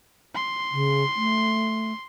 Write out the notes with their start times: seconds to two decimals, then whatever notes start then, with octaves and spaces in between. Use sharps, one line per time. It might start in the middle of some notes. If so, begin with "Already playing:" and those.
0.35 C6
0.72 C#3
1.16 A3